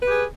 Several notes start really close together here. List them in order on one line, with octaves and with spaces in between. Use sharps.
B4 G4 G#4